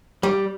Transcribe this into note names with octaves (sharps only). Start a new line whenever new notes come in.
G3